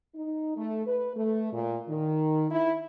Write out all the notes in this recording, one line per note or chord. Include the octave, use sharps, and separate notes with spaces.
D#4
A3
B4
A3
A#2
D#3
E4